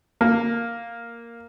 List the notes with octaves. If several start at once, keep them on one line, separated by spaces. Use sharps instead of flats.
A#3